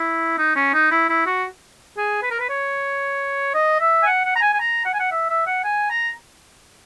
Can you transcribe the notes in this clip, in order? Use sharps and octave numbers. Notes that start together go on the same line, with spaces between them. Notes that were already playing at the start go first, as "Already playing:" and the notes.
Already playing: E4
D#4
C#4
D#4
E4
E4
F#4
G#4
B4
A#4
B4
C#5
D#5
E5
G#5
F#5
F#5
A#5
G#5
G#5
A#5
F#5
G#5
F#5
E5
E5
F#5
G#5
A#5